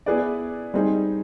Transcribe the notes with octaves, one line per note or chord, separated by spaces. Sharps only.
B3 E4 G#4 B4 D5
G3 C4 D#4 G#4